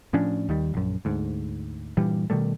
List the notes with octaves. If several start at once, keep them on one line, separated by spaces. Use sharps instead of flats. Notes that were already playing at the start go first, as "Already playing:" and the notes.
A2 F3 C#4 D4
D#2 D#3 G3
A#1 F#2
D2 G#2
G2 A#2 E3 G3
B2 D#3 G3 A3